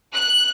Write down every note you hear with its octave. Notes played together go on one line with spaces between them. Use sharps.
F#6